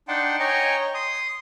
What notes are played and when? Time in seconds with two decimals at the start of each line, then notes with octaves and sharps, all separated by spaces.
0.08 D4 D#4 F#5 G5 A5 C6
0.40 C#5 D#5 G5 G#5 A#5
0.94 C6 D#6